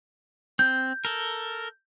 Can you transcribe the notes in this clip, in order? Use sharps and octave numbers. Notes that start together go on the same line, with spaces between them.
C4 G6
A4 A#4